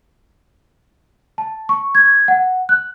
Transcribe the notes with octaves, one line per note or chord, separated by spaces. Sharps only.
A5
C#6
G#6
F#5
F#6